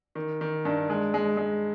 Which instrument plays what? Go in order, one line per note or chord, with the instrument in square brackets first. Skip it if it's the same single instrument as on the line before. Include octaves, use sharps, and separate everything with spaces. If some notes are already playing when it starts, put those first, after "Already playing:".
[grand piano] D#3
D#3
G2
G#3
G#3
G#3